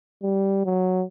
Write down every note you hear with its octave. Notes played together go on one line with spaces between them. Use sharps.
G3
F#3